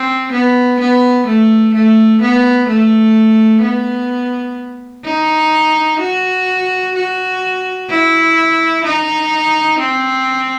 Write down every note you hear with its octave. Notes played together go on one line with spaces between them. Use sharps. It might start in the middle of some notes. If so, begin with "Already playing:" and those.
Already playing: C4
B3
B3
A3
A3
B3
A3
B3
D#4
F#4
F#4
E4
D#4
C4